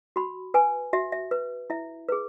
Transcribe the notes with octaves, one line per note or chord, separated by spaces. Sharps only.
F#4 B5
B4 G#5
F#4 E5
E5
B4
E4 E5
G#4 B4